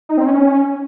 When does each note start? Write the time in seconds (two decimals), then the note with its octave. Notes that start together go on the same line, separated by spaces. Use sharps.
0.09 D#4
0.17 C4
0.26 C#4